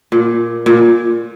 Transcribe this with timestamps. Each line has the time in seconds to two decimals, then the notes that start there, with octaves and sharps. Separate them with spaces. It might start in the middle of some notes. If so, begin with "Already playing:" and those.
0.12 A#2
0.66 A#2